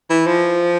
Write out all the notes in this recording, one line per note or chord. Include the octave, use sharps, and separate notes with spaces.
E3
F3